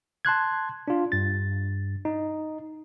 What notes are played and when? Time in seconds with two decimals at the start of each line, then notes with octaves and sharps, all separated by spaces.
0.25 A5 C6 F#6 G#6
0.88 D4 F4
1.12 G2 A6
2.05 D#4